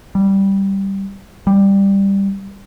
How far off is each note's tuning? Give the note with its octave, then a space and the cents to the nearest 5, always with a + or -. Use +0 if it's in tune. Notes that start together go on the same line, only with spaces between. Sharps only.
G3 -5
G3 +10